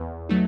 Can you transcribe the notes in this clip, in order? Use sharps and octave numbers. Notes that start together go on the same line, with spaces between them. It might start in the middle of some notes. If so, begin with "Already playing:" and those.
Already playing: E2 B3
F#3 A3 D#4